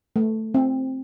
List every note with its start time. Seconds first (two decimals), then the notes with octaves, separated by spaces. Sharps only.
0.16 A3
0.54 C4